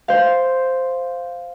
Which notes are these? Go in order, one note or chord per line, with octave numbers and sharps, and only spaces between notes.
C5 F5